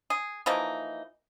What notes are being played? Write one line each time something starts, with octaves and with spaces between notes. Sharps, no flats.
G#4
E3 F3 A#3 D#4